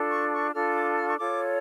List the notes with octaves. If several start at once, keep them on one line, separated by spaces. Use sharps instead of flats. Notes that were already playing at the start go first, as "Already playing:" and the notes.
Already playing: D4 F4 A4
C#6
C#6
D4 F4 A4 F6
D6
F6
C#6
F4 A4 C#5 D6